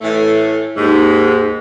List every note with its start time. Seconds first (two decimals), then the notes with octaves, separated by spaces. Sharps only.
0.01 A2 E3 A3
0.77 D#2 G#2